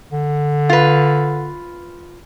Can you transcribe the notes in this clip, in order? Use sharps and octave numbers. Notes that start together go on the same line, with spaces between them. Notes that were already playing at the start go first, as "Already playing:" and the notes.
D3
F4 B4